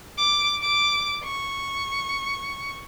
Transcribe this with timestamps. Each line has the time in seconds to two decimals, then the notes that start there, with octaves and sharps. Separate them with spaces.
0.18 D6
0.62 D6
1.24 C#6